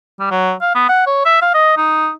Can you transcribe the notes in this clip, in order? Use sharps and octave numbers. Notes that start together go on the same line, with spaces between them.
G3
F#3
F5
B3
F#5
C#5
E5
F5
D#5
D#4